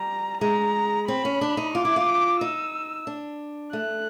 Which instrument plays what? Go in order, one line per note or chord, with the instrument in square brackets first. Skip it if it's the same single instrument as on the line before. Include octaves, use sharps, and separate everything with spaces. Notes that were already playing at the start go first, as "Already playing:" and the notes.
Already playing: [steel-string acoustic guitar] G3 [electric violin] A#5
[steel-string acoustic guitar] G#3 [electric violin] A#5
[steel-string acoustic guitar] C4 [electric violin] B5
[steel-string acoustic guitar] C#4
D4
D#4
[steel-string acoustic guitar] F4 [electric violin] D6
[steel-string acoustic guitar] E4
F4
[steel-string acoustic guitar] D#4 [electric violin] E6
[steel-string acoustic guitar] D4
[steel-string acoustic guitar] A3 [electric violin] F#6